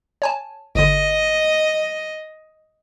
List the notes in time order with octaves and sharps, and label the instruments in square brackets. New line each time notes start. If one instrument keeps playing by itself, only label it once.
[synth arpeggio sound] C#5 G#5 A5
[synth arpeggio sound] G1 D3 [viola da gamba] D#5